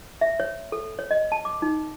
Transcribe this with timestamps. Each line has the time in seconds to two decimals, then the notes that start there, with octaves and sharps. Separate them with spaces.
0.21 E5
0.40 C#5
0.72 A4
0.99 C#5
1.11 D#5
1.32 A5
1.45 D6
1.62 D#4